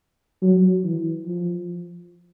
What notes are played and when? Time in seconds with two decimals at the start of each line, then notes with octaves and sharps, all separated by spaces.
0.42 F#3
0.84 E3
1.26 F3